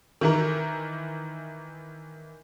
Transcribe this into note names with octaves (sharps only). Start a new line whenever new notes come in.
D#3 E3 A#4